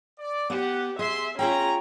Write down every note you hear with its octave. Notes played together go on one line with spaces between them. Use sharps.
D5
B3 G4 F#5
G#4 E5 C6
C#4 F4 G#4 G5 A#5